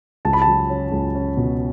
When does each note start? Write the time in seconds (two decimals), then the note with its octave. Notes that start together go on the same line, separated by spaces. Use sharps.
0.25 C#2 A5
0.33 B5
0.42 A5
0.48 F#3
0.70 C#4
0.92 C#2
1.15 C#4
1.37 B2